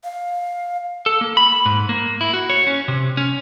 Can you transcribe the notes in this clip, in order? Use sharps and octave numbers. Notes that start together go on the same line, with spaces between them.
F5
A4
A#3
B5
G#2
A#3
E4
F#4
C#5
C#4
C3
C#4